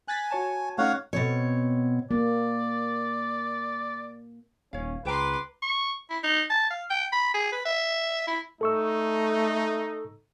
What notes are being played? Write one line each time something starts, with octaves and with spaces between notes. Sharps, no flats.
G#5 F#6 A6 B6
F#4 C#5 A5
A3 C#4 D#4 C#5 F5 F#5
B2 C4 C#5
A#3 D5
D#1 C#4 C#5 F5
C#2 B4 C5 G5 A#5 C6 D6
C#6
E4
D#4
A5
F5
G5
B5
G#4
B4
E5
E4
A3 D#4 A4 C#6 E6